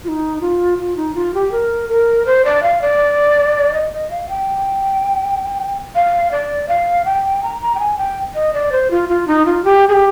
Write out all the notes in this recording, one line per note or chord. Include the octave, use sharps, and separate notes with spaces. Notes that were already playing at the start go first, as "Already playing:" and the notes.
F4
D#4
F4
F4
D#4
F4
G4
A#4
A#4
C5
D5
F5
D5
D#5
D#5
F5
G5
F5
D5
F5
G5
A#5
A#5
G5
G#5
G5
D#5
D5
C5
F4
F4
D#4
F4
G4
G#4
G4